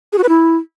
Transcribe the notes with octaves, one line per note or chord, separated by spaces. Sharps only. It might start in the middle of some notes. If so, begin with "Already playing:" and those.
G#4
F#4
B4
E4